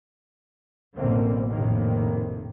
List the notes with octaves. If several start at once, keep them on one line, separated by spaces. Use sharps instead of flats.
A1 F#2 B2 D3 A#3 C4
F1 A#1 A2 C3 D#3 A#3